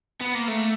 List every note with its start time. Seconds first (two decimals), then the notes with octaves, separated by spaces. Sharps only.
0.21 B3
0.35 A#3
0.48 A3